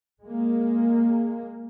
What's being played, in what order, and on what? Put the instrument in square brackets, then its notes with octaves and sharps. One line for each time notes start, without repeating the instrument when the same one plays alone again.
[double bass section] G#3 A#3